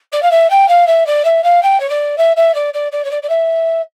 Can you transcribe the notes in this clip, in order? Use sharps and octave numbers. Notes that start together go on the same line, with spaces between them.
D5
F5
E5
G5
F5
E5
D5
E5
F5
G5
C#5
D5
E5
E5
D5
D5
D5
C#5
D5
D5
E5